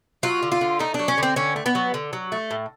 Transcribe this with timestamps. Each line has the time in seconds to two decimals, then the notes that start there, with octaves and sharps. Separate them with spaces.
0.23 F#3 F4
0.43 D3
0.52 F4
0.61 D3
0.79 A3 D#4
0.94 D4
0.99 F#3
1.08 C#4
1.18 D3 C4
1.36 D3 C#4
1.56 A3
1.66 B3
1.75 F#3
1.94 D3
2.13 F#3
2.32 A3
2.51 A2